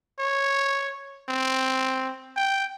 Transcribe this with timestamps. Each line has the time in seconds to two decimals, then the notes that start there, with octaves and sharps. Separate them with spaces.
0.19 C#5
1.29 C4
2.36 G5